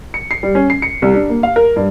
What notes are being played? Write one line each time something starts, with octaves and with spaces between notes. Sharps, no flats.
C#7
C7
G3
C#4
C7
C#7
C2
D4
A#3
F5
A#4
G2